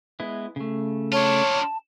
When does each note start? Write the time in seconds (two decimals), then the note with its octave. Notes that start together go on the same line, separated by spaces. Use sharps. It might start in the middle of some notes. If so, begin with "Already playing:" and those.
0.20 G#3 B3 E4
0.56 C#3 A3
1.12 D4 F4 C#5 A5